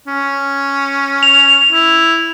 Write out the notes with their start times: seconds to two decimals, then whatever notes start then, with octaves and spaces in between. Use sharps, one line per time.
0.07 C#4
1.23 F7
1.72 E4